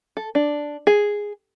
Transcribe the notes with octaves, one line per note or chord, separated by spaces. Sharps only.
A4
D4
G#4